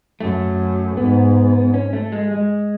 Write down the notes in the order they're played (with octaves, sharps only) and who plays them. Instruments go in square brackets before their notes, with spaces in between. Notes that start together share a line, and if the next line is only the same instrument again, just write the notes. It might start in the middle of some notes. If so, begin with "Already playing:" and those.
[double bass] F#2 [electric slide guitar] A3
[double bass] G#2 [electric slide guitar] B3
[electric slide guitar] C#4
A3
G#3
G#3